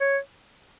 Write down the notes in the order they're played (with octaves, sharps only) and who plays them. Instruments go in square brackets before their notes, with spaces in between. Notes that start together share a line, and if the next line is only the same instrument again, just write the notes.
[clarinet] C#5